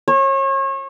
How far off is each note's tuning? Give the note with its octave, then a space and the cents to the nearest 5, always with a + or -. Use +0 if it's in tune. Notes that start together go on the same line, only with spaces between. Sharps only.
C#5 -35